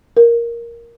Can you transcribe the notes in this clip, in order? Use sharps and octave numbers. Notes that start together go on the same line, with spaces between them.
A#4